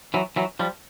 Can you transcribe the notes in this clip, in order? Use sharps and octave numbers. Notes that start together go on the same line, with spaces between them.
E3 F#3
E3 F#3
F3 G3